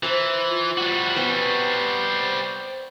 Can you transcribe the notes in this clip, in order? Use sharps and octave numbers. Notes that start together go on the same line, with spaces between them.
E3 C5 A5 A#5
F4
G3 F#4
B3 C5 G5 G#5